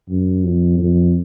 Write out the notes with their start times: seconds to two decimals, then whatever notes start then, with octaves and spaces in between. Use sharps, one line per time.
0.09 F#2
0.44 F2
0.79 F2